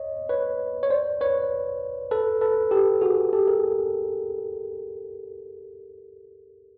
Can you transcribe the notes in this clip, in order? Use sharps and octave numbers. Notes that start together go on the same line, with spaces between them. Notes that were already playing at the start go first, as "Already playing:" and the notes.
Already playing: C#5 D#5
B4 C#5
C#5
C5 D5
B4 C#5
A4 B4
A4 B4
G4 A4
F#4 G#4
G4 A4
G#4 A#4